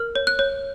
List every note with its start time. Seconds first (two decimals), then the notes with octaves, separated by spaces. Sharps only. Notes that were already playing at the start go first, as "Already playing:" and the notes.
Already playing: A#4 F6
0.16 C#5
0.27 F#6
0.39 C#5